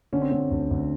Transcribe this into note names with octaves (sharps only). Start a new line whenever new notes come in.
D3 C#4
C4
D3 C#4
D2
D2